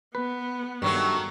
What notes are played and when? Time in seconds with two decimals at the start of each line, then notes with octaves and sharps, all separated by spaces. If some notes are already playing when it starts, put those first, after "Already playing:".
0.15 B3 B4
0.82 G2 D#3 F#3 A3 C#6